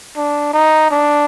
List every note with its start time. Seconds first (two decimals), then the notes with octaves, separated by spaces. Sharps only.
0.17 D4
0.54 D#4
0.91 D4